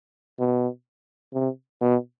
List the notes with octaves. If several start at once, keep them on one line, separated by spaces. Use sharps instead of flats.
B2
C3
B2